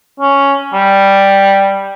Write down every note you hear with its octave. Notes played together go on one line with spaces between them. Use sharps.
C#4
G3